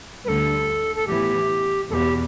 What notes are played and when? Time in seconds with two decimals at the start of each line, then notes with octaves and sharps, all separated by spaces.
0.24 D2 D3 G3 A4 B4
0.95 A4
1.06 A2 E3 B3 E4 G4
1.89 E2 B2 B3 G4 A4